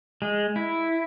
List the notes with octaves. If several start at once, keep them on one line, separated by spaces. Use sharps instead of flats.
G#3
E4